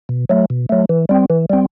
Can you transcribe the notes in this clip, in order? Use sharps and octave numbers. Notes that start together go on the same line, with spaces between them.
B2
F#3 A3
B2
F#3 A3
E3
G3 C4
E3
G3 C4